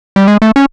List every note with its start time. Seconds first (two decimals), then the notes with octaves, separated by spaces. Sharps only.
0.16 G3
0.28 G#3
0.42 A3
0.56 C#4